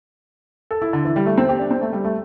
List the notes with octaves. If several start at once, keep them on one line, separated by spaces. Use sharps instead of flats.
A4
E4
D3
E3
G3
A3
C4
G4
D4
C4
A3
G3
A3